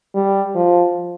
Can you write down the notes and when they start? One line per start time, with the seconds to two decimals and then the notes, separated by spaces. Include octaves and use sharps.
0.15 G3
0.55 F3